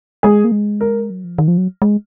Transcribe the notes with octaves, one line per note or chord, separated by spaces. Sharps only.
G#3 G#4
A#3
G#3
A#4
F#3
F3
D#3
F3
F#3
G#3